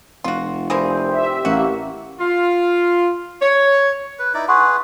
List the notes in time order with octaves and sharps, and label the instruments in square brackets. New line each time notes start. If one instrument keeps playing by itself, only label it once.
[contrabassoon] F1 [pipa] F4 F#4
[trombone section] C2 C5 [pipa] E3 A#3 G#4
[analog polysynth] G4 E5
[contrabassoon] A1 [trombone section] A#3 [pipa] F#4
[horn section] F4
C#5
[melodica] B4
D#4 E4 D5
[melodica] G#4 B4 [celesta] F#5 C6 C#6